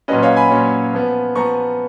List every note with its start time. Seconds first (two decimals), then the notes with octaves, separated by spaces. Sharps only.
0.08 A#2 F#3 C#4 B4 D#5
0.23 C#5 F5
0.36 G#5 B5
0.51 A#2 F#3 C#4
0.93 F3 B3
1.36 F3 B3 A#5 C#6